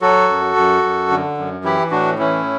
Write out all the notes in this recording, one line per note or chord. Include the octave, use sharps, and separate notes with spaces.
F#3 F#4 A4
F#2
F#2
F#2
D3
F#2
E3 E4 G4
A2 D4 F#4
E3 C#4 E4